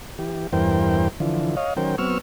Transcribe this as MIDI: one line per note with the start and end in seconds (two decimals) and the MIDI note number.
0.19 0.47 52
0.19 0.47 67
0.53 1.08 40
0.53 1.08 43
0.53 1.08 52
0.53 1.08 70
0.53 1.08 72
0.53 1.08 79
1.20 1.55 50
1.20 1.55 52
1.20 1.55 53
1.57 1.74 73
1.57 1.74 75
1.57 1.74 77
1.77 1.96 51
1.77 1.96 54
1.77 1.96 61
1.77 1.96 70
1.77 1.96 72
1.77 1.96 79
1.98 2.18 54
1.98 2.18 59
1.98 2.18 60
1.98 2.18 85
1.98 2.18 88
1.98 2.18 89